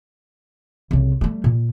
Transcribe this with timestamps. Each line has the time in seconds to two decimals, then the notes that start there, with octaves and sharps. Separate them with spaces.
0.91 C2 C#3
1.21 G3 A3
1.44 A#2